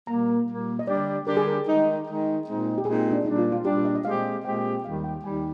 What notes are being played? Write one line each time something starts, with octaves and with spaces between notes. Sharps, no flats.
A#2 G3 A#3 A#5
A#2 G3 A#3
D#5
D3 G3 D4 G4 D5
D3 G3 D4 G4 A#4
G#4
A#4
D#3 G#3 D#4
D#3 G#3 D#4
A#2 G#3 C4 D#4
G4
A#2 G#3 C4 D#4 G#4
D4
A#2 G3 D4 D#4
F4
F4
A#2 G3 D4 G4
D#5
D#5
A#2 G#3 C4 G4 F5
A#2 G#3 C4 G4 G5
D#2 D#3 G3 F5
G5
D#2 D#3 G3 G#5